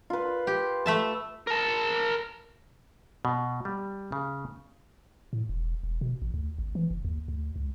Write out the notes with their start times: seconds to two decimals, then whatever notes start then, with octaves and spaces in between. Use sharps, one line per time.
0.10 F4 B4
0.47 G4
0.86 A3 E5 A5
1.47 A#4 A5
3.25 B2
3.65 G3
4.12 C#3
5.33 A2
5.49 E1
5.83 E1
6.01 B2
6.22 A1
6.34 D2
6.58 G#1
6.75 E3
6.91 F#1
7.05 D#2
7.28 D2
7.56 C#2